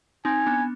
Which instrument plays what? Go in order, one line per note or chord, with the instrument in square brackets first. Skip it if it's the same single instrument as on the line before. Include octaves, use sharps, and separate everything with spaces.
[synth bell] C4 D#4 [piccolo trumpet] G#5
[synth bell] B3 D4